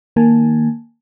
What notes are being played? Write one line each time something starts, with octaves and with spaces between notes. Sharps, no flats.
D#3 A#3 G#5 A5